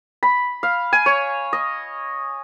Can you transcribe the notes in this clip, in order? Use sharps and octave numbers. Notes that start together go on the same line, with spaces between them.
B5
F5
G#5
C#5
D#5